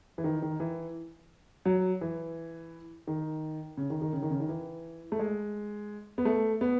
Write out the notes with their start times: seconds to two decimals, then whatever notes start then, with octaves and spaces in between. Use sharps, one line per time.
0.18 E3
0.24 D#3
0.42 D#3
0.60 E3
1.65 F#3
2.01 E3
3.07 D#3
3.77 C#3
3.90 D#3
4.02 D#3
4.13 C#3
4.22 D#3
4.31 C#3
4.40 D#3
4.49 E3
5.12 A3
5.19 G#3
6.18 B3
6.25 A3
6.61 B3